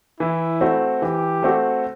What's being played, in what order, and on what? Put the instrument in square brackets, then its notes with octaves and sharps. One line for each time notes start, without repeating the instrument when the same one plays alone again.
[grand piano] E3 [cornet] E4
[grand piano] A3 C4 F#4
[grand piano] E3 [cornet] G4
[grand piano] A3 C4 F#4